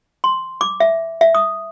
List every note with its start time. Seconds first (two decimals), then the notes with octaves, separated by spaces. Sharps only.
0.24 C6
0.61 D6
0.80 E5
1.21 E5
1.35 D#6